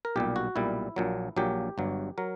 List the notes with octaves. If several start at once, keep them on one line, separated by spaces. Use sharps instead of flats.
A#4
B1 A#2 G3 G4
F#4
B1 A#2 G3 E4
A#1 A#2 F#3
A#1 A#2 F#3 G4
G1 G2 F#3
F#3 A#4